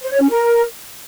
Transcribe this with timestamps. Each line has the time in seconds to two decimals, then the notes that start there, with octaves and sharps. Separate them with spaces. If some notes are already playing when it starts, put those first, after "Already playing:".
0.02 C5
0.11 C#5
0.21 C#4
0.30 A#4